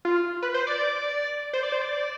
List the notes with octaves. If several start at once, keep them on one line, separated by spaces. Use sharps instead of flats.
F4
B4
C5
D5
C5
D5
C5
D5